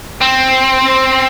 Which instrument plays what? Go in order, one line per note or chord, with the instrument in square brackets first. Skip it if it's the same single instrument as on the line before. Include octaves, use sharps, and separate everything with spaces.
[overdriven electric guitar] C4